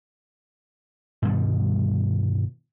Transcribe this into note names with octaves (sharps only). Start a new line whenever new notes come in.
G2 B2 D#3 G3